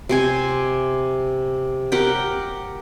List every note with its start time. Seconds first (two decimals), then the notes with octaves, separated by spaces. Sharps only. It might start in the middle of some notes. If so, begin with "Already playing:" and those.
0.09 C3 C5 G#5
1.92 G4 A#4 F#5 G5